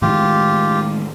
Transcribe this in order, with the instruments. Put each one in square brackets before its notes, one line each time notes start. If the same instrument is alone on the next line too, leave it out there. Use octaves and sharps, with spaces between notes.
[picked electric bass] A2 D#3 G#3 [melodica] F4 G4